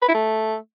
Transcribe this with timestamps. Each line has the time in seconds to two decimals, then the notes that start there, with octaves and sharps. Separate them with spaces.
0.02 B4
0.08 E4
0.15 A3